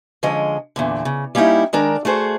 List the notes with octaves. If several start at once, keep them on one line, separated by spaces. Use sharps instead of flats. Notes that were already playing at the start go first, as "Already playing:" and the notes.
D3 F3 G#3 C#4 D#5
E2 A#2 D3
C#3
G3 A#3 C#4 D#4 E4 G4
D#3 G#3 D4 A#4
A3 F#4 G#4 C5